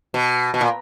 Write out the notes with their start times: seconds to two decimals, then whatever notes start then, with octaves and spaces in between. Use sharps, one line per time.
0.14 B2
0.54 B2
0.61 A#2